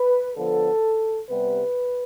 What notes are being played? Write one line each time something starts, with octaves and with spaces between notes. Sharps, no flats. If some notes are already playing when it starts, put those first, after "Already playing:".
Already playing: B4
D3 F3 B3 A4
C3 G3 B3 B4